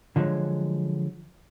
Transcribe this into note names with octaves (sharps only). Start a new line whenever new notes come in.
D3 F3 F#3 G#3